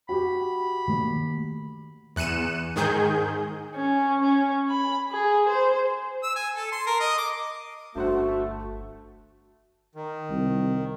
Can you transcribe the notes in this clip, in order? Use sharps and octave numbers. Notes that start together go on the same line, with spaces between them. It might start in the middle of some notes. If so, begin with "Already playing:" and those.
F#4 G4 B5
D#3 A3 A#3
E2 F#6 C#7 D#7 E7
G#2 D#3 G#4 G6
C#4
C#4
B5
G#4
C5
E6
G#5
A4
C6
A#4
D#5
D6
G1 G2 A3 F#4 C5 F#5
D#3
C2